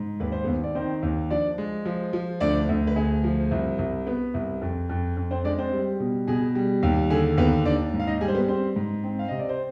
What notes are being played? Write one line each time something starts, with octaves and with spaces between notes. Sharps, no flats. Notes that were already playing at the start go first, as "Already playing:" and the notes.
Already playing: G#2
D#2 B4
C5
D#2 B3 B4
D5
D#3 C4 C5
D#2
F3 D4 D5
G#3
F3
F3
D2 D4 D5
D2
B4
D2 G#4
F3
C2
C2
B3 B4
C2
F2
F2
F2
C4 C5
G#3 D4 D5
C4 C5
G3
B2
B2 G#4
G3
D#2 G4
D3 G#4
D#2 B3 B4
D#2 D4 D5
G#2
F5
D#4 D#5
G3 G#4
C5
B3 B4
C4 C5
G#2
C4
F5
C3 D#5
D5
C5